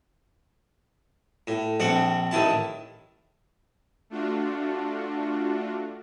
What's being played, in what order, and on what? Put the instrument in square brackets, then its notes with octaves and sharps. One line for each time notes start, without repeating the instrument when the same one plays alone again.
[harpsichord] A2
A#1 C4 D4 F#5
A1 D#3 E4 A5
[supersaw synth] A3 D4 F4 F#4